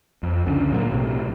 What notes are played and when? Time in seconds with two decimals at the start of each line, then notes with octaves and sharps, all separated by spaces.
0.23 F2
0.46 C#2 D3 C#4
0.72 A#2 F#3 G#3 A#3
0.91 B1 A2 C3